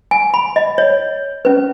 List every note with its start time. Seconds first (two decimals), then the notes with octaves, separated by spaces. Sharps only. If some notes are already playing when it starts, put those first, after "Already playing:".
0.11 G#5
0.34 B5
0.56 D#5
0.78 C#5
1.45 C#4 B4